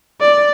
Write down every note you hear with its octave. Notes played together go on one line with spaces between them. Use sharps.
D5